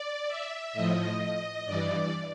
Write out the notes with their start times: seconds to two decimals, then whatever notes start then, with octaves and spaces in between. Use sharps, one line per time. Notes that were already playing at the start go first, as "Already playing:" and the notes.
Already playing: D5
0.28 E5
0.73 A2 F3 D#5
1.66 G2 E3 D5